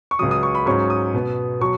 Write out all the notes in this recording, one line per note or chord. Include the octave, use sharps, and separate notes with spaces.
C#6
C#2 C#3 F#3 D#6
D#6
C#6
B5
G#2 F#3 C#4 C#6
D#6
B2 B3
B2 F#3 C#6